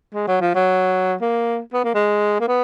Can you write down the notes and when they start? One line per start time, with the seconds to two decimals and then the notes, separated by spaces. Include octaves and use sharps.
0.15 G#3
0.27 F#3
0.41 F3
0.55 F#3
1.21 A#3
1.74 B3
1.84 A#3
1.94 G#3
2.41 A#3
2.48 B3